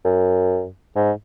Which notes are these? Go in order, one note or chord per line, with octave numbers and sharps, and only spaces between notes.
F#2
G#2